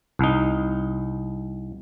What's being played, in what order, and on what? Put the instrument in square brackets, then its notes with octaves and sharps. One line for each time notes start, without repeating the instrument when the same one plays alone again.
[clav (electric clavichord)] C2 D#4